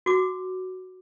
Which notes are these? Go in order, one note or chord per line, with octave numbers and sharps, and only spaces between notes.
F#4 D6